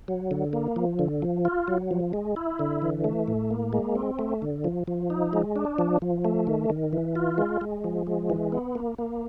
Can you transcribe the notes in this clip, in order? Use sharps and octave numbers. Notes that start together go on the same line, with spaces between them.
F#3
D3
A#3
F3
D3
F3
F4
F#3
F3
G#3
E4
D3
E3
A3
A2
A#3
G#3
C4
A3
D3
F3
F3
D#4
G#3
D4
F3
F3
A3
D#3
D#3
E3
F4
G#3
G#3
F3
G#3
E3
B3
A#3
A#3